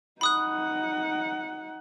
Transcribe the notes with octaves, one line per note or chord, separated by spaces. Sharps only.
D#4 F#5 B5 D#6 F#6